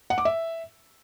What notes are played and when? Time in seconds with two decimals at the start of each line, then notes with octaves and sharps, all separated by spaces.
0.10 F#5
0.18 D6
0.25 E5